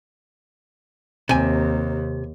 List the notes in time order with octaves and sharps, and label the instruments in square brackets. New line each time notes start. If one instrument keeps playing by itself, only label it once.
[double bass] D#2 [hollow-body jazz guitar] C3 G#5